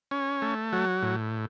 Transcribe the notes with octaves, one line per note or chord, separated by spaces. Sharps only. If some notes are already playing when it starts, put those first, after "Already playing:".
C#4
A3
F#3
A2